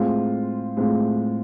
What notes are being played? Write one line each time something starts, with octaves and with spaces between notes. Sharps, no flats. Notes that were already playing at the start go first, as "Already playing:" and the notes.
Already playing: A2 G#3 C4 F4
A2 G#3 C4 F4